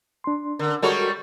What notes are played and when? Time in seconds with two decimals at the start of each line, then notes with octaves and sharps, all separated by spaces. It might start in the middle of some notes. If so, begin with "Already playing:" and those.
0.24 D4 C6
0.59 D3 A#4
0.82 G3 G#3 F#4 A4 A#4 C#5